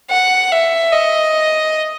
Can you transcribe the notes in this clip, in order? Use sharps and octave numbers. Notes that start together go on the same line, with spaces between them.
F#5
E5
D#5